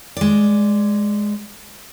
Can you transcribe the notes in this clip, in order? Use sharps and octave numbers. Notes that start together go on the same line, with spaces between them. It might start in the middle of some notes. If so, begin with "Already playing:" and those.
G#3 D5